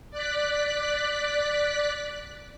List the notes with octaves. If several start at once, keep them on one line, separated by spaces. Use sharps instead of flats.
D5 F#6 B6